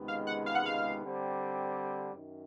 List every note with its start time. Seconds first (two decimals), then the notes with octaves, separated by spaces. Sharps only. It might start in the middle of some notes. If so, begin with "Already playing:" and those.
Already playing: C#2 C3 D#3 G#3 B3
0.08 F5
0.27 F#5
0.46 F5
0.55 F#5
0.65 F5
1.02 D3 G3 C4
2.14 F#2 D#3